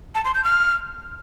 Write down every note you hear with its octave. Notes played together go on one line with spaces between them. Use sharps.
A5
C6
G6
F6